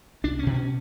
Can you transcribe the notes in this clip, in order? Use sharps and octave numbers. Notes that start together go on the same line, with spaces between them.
C2 D4
C#4
B2
C#4